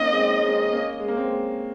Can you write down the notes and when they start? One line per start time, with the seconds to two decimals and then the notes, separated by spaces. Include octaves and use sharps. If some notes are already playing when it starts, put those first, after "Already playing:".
Already playing: A#3 C4 C#4 D#4 D#5
0.12 G#3 C4
0.42 G#3 C4
0.72 A#3 C#4
1.00 G#3
1.08 A#3
1.17 G#3 C4